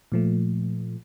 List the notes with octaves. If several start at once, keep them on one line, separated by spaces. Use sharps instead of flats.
A#2 F3 A3